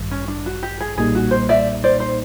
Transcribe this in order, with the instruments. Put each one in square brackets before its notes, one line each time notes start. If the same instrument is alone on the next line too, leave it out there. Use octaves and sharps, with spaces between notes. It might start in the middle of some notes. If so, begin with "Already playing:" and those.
Already playing: [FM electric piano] A1 G2 D#3 G3
[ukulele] C#4
D4
F#4
G4
G#4
[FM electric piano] B1 A#2 G3 A#3 D#4 [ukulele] G#4
[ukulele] F#4
C5
D5 E5
C5 D5
C5